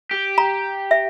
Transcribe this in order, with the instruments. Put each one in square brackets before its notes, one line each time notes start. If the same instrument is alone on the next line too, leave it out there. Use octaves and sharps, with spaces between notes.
[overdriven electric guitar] G4
[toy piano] A#5
E5